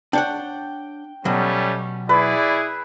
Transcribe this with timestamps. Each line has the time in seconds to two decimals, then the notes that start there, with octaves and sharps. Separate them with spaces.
0.13 D4 C#5 F#5 G5
1.25 B2 F#3 G3 A3 C#4
2.09 E4 G#4 B4 D5